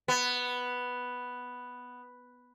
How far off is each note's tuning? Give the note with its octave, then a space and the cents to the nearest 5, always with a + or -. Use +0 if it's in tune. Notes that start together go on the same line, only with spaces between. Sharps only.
B3 +0